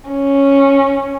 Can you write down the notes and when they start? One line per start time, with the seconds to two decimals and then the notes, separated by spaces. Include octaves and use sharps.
0.11 C#4